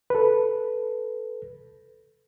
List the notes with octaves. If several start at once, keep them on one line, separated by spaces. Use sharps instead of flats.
A4 B4